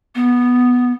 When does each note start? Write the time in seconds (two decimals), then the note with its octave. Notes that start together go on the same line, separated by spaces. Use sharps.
0.15 B3